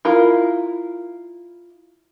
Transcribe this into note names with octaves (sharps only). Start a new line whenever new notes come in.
E4 F4 A#4